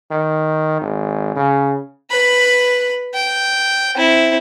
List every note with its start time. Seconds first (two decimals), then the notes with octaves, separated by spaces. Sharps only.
0.11 D#3
0.81 G#1
1.36 C#3
2.11 B4 B5
3.14 G5
3.96 C4 E4